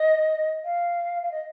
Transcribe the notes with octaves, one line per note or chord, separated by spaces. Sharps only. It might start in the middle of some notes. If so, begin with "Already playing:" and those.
Already playing: D#5
F5
F5
D#5